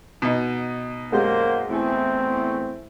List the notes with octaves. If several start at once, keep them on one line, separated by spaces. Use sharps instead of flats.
B2 D#4
F#2 G#3 A#3 F#4 G4 C5
E2 A3 C4 E4 G#5